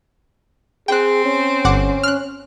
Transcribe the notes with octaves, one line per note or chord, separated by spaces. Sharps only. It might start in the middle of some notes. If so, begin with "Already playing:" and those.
C4 G#4 G5 F#6
C#4
G1 F#5 D6
F6 F#6